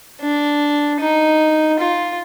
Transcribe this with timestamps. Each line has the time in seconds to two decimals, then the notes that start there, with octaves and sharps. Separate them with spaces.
0.21 D4
1.00 D#4
1.79 F4